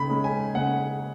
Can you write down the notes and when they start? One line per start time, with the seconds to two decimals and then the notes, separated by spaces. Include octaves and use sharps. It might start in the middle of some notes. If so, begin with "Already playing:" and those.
Already playing: C#3 B5
0.10 G#3 C#4
0.24 G#5
0.55 C#3 F#5